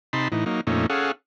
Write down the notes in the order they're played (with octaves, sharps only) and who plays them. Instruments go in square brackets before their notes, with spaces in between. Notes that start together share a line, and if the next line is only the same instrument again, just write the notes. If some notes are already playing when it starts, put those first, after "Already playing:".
[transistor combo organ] C3 D#4 A5 B5 C6
A2 E3 D#4
F#3 A#3 D#4
F2 A#2 A3 C#4 D#4
C#4 G#4 A4 F5 F#5